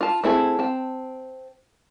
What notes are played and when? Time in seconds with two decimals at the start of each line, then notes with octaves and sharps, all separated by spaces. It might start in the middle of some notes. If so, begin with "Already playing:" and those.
0.01 F4 A5
0.24 A3 C4 E4 G#4
0.59 C4 A5